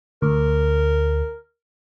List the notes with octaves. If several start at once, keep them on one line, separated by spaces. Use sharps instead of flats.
D2 A#4